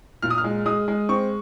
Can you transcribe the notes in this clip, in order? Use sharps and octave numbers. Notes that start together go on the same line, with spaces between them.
A#2 F6
D#6
F6
G#3
G#3 D#6
G#3
C4 C#6